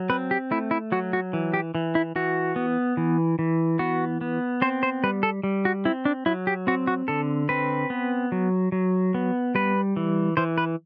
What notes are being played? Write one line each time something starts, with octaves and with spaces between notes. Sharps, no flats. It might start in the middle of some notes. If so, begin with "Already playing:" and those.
Already playing: F#3
C4 B4
G4
A3 E4
E4
F#3 F#4
F#4
E3
G4
E3
E4
E3 F#4
B3
E3
E3
B3 F#4
B3
C4 C5
C5
G3 B4
A4
G3
F#4
C4 E4
D4
F#3 E4
G4
C4 F#4
F#4
D3 A4
C4 B4
B3
F#3
F#3
B3
G3 B4
E3
E3 C5
B4